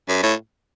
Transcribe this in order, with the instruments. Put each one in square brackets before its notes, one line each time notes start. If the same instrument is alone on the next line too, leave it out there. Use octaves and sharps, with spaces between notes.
[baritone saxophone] F#2
A2